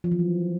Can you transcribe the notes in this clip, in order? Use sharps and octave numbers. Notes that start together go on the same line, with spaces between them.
F3
E3
F#3